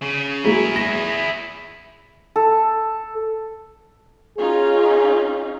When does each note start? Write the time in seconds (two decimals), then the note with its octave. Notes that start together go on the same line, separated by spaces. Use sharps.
0.02 C#3
0.44 F#3 G#3 A#3 E4 G#4
0.76 A#6
2.36 A4
4.38 C#4 D#4 F4 G#4